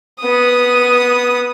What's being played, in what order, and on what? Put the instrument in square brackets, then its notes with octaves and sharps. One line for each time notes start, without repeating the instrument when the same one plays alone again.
[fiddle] B3 D#6